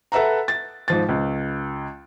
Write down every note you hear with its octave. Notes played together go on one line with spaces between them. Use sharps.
A4 B4 E5 F#5 A#5
A6
G#2 F3 A6
C#2